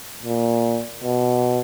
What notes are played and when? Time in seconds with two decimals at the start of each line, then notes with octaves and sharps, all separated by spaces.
0.23 A#2
1.04 B2